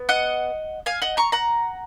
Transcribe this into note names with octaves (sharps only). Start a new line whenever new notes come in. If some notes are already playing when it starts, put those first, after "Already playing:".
Already playing: B3
D#5 F#5
F5 G#5
D#5 F#5
A#5 C#6
F#5 A#5